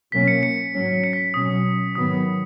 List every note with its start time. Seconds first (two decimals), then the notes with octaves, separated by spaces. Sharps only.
0.12 B2 F#3 A#3 C#4 B6
0.28 C#7
0.43 C#7
0.73 G#2 F#3 C#4
1.04 C#7
1.13 B6
1.33 B2 F#3 C#4 D#6
1.95 G#2 D#3 F#3 B3 D#6